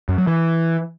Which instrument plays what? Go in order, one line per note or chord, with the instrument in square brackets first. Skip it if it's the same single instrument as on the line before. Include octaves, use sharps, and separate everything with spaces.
[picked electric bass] F#2
F#3
E3